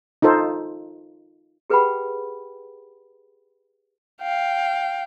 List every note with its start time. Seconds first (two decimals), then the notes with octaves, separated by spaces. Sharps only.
0.22 D#4 F4 A4 C5
1.70 G4 G#4 B4 F#5 G5 B5
4.21 F5 G5